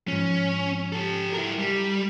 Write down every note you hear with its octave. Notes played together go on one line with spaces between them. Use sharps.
G#2 F3 C#4
G4 A4
E4 A#4
G3